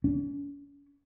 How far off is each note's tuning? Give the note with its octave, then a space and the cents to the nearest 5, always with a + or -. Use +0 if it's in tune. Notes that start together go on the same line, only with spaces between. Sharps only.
C#4 +40